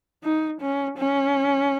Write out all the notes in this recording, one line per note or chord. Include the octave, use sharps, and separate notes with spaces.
D#4
C#4
C#4